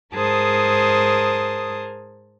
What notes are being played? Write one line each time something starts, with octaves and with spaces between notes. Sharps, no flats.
G#2 G#4 A#4 C5 A5 D#6